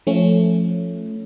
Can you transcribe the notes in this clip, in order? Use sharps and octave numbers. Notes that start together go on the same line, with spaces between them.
F3 A3 C#4